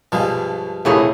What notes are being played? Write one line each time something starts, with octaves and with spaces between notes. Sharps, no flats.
B1 G2 F3 G#3 F5
A#1 D#2 A2 C3 E4 G#4 C#5